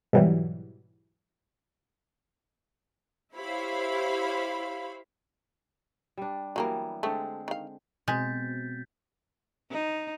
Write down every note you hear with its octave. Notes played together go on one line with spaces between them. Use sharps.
G#2 B2 E3 F#3 G3
E4 G4 C5 C#5 F5 B5
G3 D4
E3 F#3 G3 A#3 B3 A#4
D3 G#3 A3 C4
D#3 F5
B2 G#3 C4 G6 A6 B6
D#4